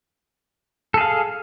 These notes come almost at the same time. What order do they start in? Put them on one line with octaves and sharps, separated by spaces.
A4 G#4 F5